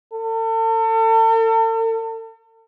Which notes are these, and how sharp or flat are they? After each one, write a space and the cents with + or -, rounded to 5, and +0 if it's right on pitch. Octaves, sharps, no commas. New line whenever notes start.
A4 +40